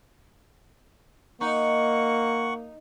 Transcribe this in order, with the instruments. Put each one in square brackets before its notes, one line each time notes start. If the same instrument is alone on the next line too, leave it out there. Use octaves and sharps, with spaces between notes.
[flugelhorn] A#3 [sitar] D#4 [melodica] F#5 C#6